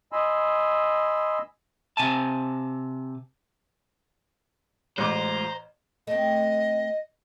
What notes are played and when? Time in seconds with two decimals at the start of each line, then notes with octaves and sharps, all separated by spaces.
0.12 D#5 G#5 B5 C6 E6
1.97 C3 G#5 A5
4.98 A1 G#3 A3 F4 C5 A#5 D6
6.07 A3 C4 D#5